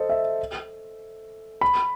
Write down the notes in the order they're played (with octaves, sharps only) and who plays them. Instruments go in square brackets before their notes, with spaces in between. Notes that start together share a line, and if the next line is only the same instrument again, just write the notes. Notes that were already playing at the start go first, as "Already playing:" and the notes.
Already playing: [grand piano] A4 C5 D#5
E5
B5